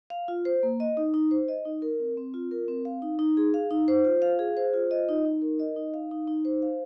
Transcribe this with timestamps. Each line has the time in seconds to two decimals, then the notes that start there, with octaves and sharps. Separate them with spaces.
0.10 F5
0.28 F4
0.45 C5
0.63 A#3
0.80 D#5
0.97 D#4
1.14 D#4
1.31 C5
1.48 D#5
1.65 D#4
1.82 A#4
2.00 C4
2.17 C4
2.34 F4
2.51 A#4
2.68 C4
2.85 F5
3.02 D#4
3.19 D#4
3.37 G#4
3.54 F5
3.71 D#4
3.88 C5
4.05 F4
4.22 F5
4.39 G#4
4.57 C5
4.74 F4
4.91 D#5
5.09 D#4
5.25 D#4
5.42 A#4
5.59 D#5
5.76 D#4
5.94 F5
6.11 D#4
6.27 D#4
6.45 C5
6.62 F5